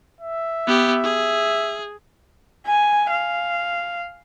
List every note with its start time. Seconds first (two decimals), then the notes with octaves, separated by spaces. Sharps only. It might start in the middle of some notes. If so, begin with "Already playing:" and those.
0.21 E5
0.67 B3 G4
1.04 G#4
2.67 G#5
3.11 F5